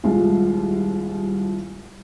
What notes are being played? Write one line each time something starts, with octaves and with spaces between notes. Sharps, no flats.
D#1 C2 G#3 F4